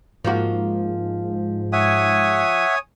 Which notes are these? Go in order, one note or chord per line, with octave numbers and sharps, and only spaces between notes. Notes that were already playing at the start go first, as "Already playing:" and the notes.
G#2 F3 A#3 F#4
C#5 E5 F#5 G#5 D#6